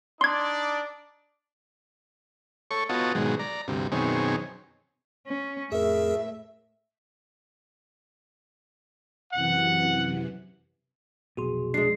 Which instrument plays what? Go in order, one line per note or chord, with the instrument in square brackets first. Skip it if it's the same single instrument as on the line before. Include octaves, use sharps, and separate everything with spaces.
[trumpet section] D4 D#4 D5 [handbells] C6 G#6
[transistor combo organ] A4 C#5 C#6
B3 F4 F#4 C#5 D#5 A5
G#2 B2 D#3 F#3 G#3
D5 A#5
D2 G2 C3
F#2 B2 D#3 C4 G#4 C#5
[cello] C#4
[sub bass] F2 [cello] A2 [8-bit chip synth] G#4 A#4 [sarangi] E5
[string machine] F#2 C3 E3 [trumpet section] F#5
[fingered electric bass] F1 B1 B2 [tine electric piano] F#4 G#4 C6
[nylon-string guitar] G#3 D4 [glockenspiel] C7